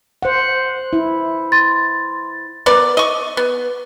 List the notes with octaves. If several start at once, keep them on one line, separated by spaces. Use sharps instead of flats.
C5 F#5
E4
C6 A6
B3 A#4 B4 D5
D#5 C#6
B3